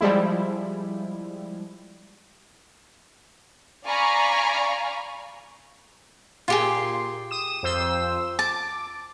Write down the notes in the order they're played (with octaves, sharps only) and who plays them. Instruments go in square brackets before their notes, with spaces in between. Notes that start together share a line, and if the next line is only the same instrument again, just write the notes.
[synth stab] F3 G3 G#3 E4
[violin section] D5 F5 G#5 A#5 B5 C#6
[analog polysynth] A#2 C6 [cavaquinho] F4 G4 G#4
[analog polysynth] D#6 E7
F2 C5 E6
[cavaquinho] A5 [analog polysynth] D6